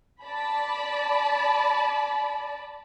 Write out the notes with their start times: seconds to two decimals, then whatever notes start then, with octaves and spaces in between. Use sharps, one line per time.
0.23 D5 A5 B5